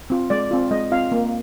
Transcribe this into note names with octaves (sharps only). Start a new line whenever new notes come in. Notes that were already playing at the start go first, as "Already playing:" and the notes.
C4 F4
G#3 D5
C4 F4
G#3 D#5
C4 F4 F5
A#3